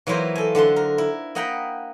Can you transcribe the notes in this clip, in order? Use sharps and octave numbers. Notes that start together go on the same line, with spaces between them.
E3 F#3 A#3 E4 F4 C5
A4 G#5
D3 F#5 A5 C6
A#4
E4
A#3 D#5 F#5 G5 A#5 B5